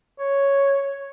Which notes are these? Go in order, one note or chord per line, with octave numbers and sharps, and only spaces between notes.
C#5